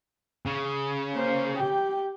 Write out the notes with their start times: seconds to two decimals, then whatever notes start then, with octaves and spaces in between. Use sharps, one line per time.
0.47 C#3
1.13 A#3 C5
1.57 G4 G5